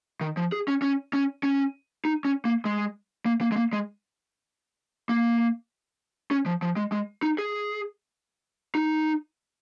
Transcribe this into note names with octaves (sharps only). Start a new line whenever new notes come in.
D#3
F3
G#4
C#4
C#4
C#4
C#4
D#4
C#4
A#3
G#3
A#3
A#3
G#3
A#3
G#3
A#3
C#4
F3
F3
G#3
G#3
D#4
G#4
D#4